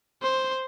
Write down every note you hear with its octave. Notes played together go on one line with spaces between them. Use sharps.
C5